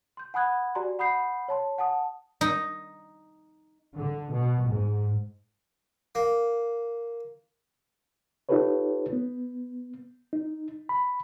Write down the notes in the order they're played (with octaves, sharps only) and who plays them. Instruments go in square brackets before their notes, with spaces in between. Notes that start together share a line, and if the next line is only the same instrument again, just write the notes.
[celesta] C6 G6
F#5 G#5 B5 D#6 F#6 G#6
F#4 G4 D5 G#5 A#5 C6
F#5 B5 D#6 G6 C7
C#5 A5 C6
F#5 G#5 A5 D#6
[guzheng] D#4
[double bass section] D3
B2
G#2
[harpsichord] A#3
[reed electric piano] D#4 F4 G4 A4 B4 C#5
B3
D#4
B5